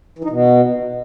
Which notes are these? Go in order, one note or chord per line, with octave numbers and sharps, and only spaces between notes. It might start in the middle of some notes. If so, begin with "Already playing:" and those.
E3
D#4
B2